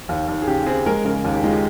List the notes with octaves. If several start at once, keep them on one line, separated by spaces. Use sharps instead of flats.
D#2
D#2
G#4
C#3 G4
C4 G#4
G#3 A#4
C#3 A#4
D#2
G4
G#3 F4
G4